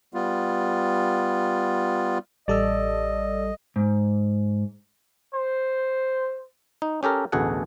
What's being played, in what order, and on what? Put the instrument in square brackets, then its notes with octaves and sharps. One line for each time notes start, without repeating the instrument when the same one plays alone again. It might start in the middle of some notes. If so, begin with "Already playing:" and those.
[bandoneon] G3 B3 F4
[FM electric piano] A1 G3 A4 [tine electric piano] D5 E6 [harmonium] D#5
[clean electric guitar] G#2
[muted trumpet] C5
[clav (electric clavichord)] D#4
C#4 G4 A4 A#4
A1 D2 B2 G#4 A4 F#5